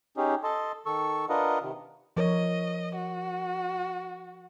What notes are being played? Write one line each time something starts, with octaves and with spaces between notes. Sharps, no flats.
C#4 D#4 G4 G#4
A4 D#5 A5 C6
D#3 A4 C#6 E6
D4 F4 A#4 B4 D#5 F#5
C3 D#3
F3 A#4 C#5 D#5
F#4